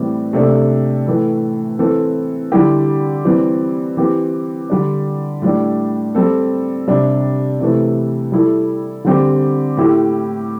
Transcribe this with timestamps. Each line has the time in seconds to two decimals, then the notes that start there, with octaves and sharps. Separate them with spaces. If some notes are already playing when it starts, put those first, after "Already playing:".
Already playing: A2 E3 G3 C4
0.33 C3 A3 D4 A4
1.06 A2 E3 A3
1.79 E3 C4 A4
2.52 D3 G3 E4 G4
3.25 E3 G3 C4
3.97 E3 C4 G4
4.70 D3 G3 D4
5.42 A2 G3 D4
6.15 G3 C4 A4
6.87 C3 G3 D4
7.60 C3 E3 A3
8.32 G3 E4 A4
9.05 D3 G3 C4 G4
9.77 A2 A3 E4 G4